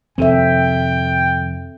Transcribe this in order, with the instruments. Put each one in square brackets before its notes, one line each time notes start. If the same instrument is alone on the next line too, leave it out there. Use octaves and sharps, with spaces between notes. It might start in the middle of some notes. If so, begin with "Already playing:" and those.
[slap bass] F2 C3 D#3 [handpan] C4 A4 E5 [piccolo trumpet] G5